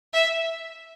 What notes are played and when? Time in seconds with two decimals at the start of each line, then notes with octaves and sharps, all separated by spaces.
0.13 E5